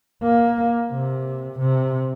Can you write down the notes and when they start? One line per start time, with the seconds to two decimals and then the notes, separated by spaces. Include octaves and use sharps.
0.23 A#3
0.92 C3
1.60 C3